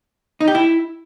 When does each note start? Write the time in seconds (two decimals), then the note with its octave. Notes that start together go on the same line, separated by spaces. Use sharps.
0.40 D#4
0.48 G4
0.55 E4